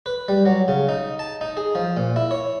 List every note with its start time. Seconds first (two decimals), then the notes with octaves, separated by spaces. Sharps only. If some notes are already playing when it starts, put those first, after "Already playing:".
0.06 B4
0.28 G3
0.46 F#3
0.68 C#3
0.89 D#4
1.19 A5
1.41 D#4
1.57 G#4
1.75 F3
1.97 A#2
2.16 E4
2.31 C#5